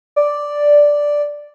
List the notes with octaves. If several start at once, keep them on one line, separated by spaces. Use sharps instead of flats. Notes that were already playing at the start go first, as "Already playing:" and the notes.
D5